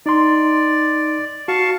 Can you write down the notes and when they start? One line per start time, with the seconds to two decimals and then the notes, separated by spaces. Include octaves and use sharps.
0.06 D#4 D5 C6
1.48 F#4 F5 A5 C#6